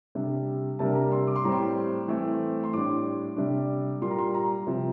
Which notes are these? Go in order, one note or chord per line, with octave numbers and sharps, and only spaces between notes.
C3 G3 D4
C3 G3 A#3 D4 A5
A#5
C6
D6
C6
A2 G3 C4 A#5
C6
E3 A3 C4
C6
A2 G3 D4 D6
C3 G3 D4
A#2 G3 A#3 C6
A#5
C6
A#5
C3 F3 C4